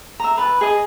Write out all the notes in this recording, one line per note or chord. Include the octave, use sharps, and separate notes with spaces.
E5 A#5
B4 A5
G#4 D#5